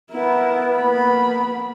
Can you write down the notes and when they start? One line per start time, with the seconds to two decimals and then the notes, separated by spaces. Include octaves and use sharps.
0.12 B3 E4 A#4
0.77 A#3 B5